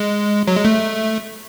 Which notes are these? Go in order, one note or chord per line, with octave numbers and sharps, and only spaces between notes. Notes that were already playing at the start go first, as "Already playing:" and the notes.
Already playing: G#3
F#3
G#3
A3